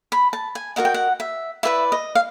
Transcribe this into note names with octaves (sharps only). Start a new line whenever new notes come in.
B5
A5
G#5
F#4 A#4 D#5 F#5
G5
F#5
E5
E4 G4 B4 D5 E5
D#5
F5